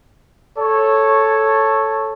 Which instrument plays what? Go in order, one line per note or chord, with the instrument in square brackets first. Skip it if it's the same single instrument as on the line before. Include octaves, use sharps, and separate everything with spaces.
[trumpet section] A4 C#5